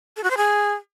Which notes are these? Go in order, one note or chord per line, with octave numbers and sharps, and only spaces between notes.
A4
F#4
C5
G#4